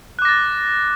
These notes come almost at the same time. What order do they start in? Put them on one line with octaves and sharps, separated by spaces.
F#6 D6 A#6 A6